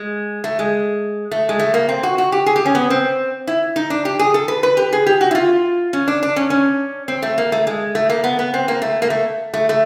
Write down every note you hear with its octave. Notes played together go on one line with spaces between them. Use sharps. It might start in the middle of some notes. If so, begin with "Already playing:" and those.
Already playing: G#3
A3
G#3
A3
G#3
A3
A#3
C4
F#4
F#4
G4
G#4
G4
C#4
B3
C4
E4
D#4
D4
G4
G#4
A4
B4
B4
G4
G#4
G4
F#4
E4
F4
C#4
D4
D4
C#4
C#4
C4
A3
A#3
A3
G#3
A3
A#3
B3
B3
C4
A#3
A3
A#3
A3
A3
A3